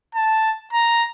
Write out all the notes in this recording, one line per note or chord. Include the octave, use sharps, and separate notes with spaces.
A5
A#5